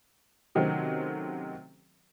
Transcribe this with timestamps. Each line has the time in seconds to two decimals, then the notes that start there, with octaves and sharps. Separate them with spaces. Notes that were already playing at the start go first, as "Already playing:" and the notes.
0.55 C3 D#3 F#3 A3 C4 C#4